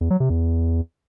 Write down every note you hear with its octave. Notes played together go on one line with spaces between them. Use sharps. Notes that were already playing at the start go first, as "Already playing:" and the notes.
E2
F#3
C3
E2